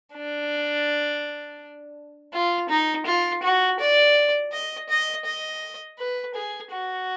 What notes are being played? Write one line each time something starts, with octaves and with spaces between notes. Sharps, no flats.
D4
F4
D#4
F4
F#4
D5
D#5
D#5
D#5
B4
G#4
F#4